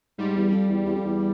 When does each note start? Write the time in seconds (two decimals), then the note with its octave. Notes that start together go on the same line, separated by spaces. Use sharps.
0.18 G#2 G3
0.35 E2
0.51 F2
0.69 E2
0.85 E2
0.95 F2
1.05 E2